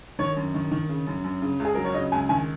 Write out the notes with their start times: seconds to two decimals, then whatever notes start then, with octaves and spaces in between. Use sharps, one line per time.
0.19 D#3 C#5
0.36 F#2
0.54 D#3
0.71 D#3
0.89 C#3
1.07 F#2
1.24 F#2
1.42 C#3
1.59 C#2
1.65 G#4
1.75 F#3 A#4
1.85 C#5
1.94 C#3 D#5
2.12 C#2 G#5
2.29 D#3 G#5